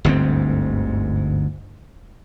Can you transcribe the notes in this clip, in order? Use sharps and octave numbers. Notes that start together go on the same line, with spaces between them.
G1 D2 G#2 C4